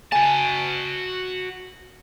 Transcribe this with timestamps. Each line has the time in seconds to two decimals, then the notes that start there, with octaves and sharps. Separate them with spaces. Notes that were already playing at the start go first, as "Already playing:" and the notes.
0.12 F#4 G#5 A5